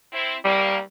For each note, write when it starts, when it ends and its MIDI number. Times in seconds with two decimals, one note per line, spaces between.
0.13 0.35 60
0.13 0.35 64
0.45 0.80 55
0.45 0.75 58